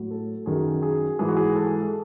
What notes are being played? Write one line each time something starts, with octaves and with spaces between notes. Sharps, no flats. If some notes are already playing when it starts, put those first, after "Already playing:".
Already playing: A2 F#3
A4
F#2 D#3 F#3 G#4
G#4
G#2 E3 G#4
F#4
G#4
A4